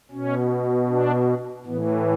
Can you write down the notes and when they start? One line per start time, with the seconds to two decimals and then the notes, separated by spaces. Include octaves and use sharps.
0.11 B2 C#4
0.88 D4
1.65 A2 E3 B3